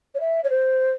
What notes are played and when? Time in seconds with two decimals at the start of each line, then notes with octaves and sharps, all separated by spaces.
0.14 C#5
0.20 E5
0.44 C#5
0.50 C5